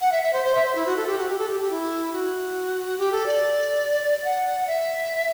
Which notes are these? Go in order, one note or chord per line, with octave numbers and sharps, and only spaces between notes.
F#5
E5
E5
C5
C5
E5
C5
E4
F#4
A4
G4
F#4
G4
A4
G4
G4
E4
F#4
G4
A4
D5
F#5
E5